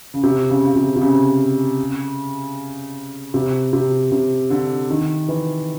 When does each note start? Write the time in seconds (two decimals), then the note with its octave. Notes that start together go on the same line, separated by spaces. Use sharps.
0.14 C#3
0.23 C3
0.50 C#3
0.64 C#3
0.76 C3
0.96 C3
1.01 C#3
3.34 C3
3.73 C3
4.12 C3
4.50 D3
4.90 D#3
5.29 E3